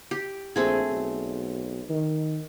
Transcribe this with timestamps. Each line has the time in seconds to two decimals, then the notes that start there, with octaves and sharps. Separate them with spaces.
0.11 G4
0.56 A#1 A3 C4 G#4
0.91 B1
1.89 D#3